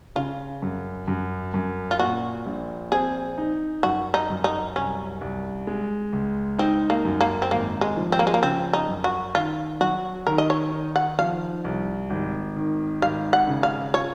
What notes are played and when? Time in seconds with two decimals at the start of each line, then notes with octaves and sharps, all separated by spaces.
0.16 C#3 F4
0.62 F#2
1.08 F#2
1.54 F#2
1.91 F4
1.99 A#2 F#4
2.46 A#1
2.92 C4 G#4
3.38 D#4
3.83 F#2 F#4
4.14 D#4
4.30 F#2
4.44 D#4
4.76 C2 C#4
5.21 C2
5.67 G#3
6.13 C#2
6.58 C4 D#4
6.90 A#3
7.05 F#2
7.21 A#3
7.42 C4
7.51 G#1 A#3
7.81 G#3
7.97 F3
8.12 C4
8.19 A#3
8.27 G#3
8.34 A#3
8.43 C#3 C4
8.73 D#4
8.88 F#2
9.04 F#4
9.35 D#3 F4
9.81 F#3 F#4
10.27 D#3 A#4
10.38 D#5
10.50 C#5
10.72 D#4
10.96 F#5
11.19 F3 F5
11.64 C2
12.10 G#1
12.56 D#3
13.02 G#1 F5
13.33 F#5
13.48 C#3
13.63 F5
13.94 F4 C#5